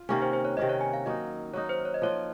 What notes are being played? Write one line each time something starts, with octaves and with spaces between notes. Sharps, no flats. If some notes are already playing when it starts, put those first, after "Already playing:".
Already playing: F4
C3 D#3 A#3 C#4
C5
C5
C#5
C3 D#3 A#3 C#4 D#5
C#5
G#5
F5
F#3 A#3 D#4 D#5
F#3 A#3 D#4 C#5
C5
C#5
D#5
F3 A#3 F4 C#5